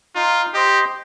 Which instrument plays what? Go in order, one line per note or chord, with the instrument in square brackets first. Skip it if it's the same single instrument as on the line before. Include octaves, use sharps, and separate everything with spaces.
[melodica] D#4 [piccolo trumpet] F4
[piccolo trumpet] G4 [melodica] C5 D#5